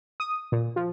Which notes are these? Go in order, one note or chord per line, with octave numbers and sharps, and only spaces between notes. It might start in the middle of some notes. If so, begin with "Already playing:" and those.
D#6
A#2
F3